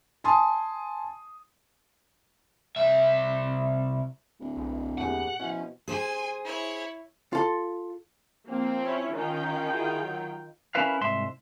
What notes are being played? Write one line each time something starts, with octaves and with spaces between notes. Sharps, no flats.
G#5 A5 C6 D#6
C2 E5
D1
B1
E2 A#2 G4 G#4 F#5
B2 F3 C#4 E4
G#4 C5 G#5 C6
E4 C#5
F4 A4 C6
F3 A#3 C4
C#4 E4 C#5
D#3 C#4 F4 G5
E4 F#4 G#4
F#3
C#4 E4 A#4 B4 F5
C2 G#2 E5 C6